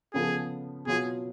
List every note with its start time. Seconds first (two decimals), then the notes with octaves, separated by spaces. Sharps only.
0.14 C#3 F3 B3 F4 G#4 A4
0.87 B2 F#3 B3 F4 G#4